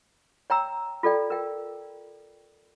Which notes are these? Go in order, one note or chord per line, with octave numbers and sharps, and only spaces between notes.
C#5 G5 A#5 E6
F4 A4 D5 G5
A#4 G5